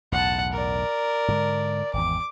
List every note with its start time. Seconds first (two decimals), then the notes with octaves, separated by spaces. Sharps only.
0.12 B1 E2 A2 F#5 A5
0.52 A#4 D5
1.28 G#2 D3 G#3
1.93 G#1 E2 D6